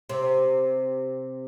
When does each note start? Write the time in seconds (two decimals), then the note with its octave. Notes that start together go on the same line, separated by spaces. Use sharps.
0.09 C3